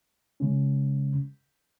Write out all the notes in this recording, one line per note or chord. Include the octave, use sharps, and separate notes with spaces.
C#3 G#3 C#4